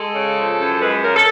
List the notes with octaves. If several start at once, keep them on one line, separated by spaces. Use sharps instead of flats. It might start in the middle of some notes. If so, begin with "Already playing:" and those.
Already playing: G#3 A4
C#3
F3
F#2
G#3 B4
C#3 A#4
A4